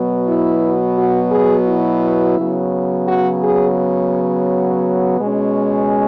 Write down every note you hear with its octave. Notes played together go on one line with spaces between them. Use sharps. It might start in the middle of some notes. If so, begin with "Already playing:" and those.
Already playing: B2 F#3 B3
E4
F#4
G#4
E4
C#3 F#3 B3
F#4
G#4
B2 G#3 C#4